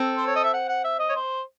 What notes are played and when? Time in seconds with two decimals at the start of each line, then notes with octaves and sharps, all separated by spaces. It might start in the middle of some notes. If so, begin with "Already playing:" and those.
Already playing: C4 A4
0.17 C5
0.27 C#5
0.35 D#5
0.44 E5
0.53 F#5
0.69 F#5
0.84 E5
0.99 D#5
1.09 C#5
1.16 C5